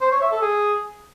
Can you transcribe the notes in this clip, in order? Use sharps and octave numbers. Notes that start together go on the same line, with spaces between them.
C5
C#5
E5
A4
G#4